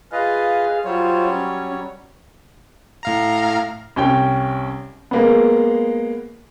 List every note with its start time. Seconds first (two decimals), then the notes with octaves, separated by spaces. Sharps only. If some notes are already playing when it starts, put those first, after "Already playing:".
0.12 F4 G#4 B4 D#5 F5
0.85 F#3 G3 F4 C5 C#5
1.25 C#4
3.03 A2 F5 A#5
3.96 C2 C#4 G5
5.11 G#3 A#3 B3